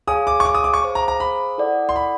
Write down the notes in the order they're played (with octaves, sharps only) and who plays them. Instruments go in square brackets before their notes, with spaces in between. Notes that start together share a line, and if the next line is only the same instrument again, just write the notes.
[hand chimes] G#4 C#5 F5 G#5 [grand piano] D#6
[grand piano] D6
C#6
D6
D#6
D6
C#6
[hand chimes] G#4 C5 F5 G#5
[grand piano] A#5
A#5
B5
[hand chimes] E4 A4 D5 F#5
[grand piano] C6
B5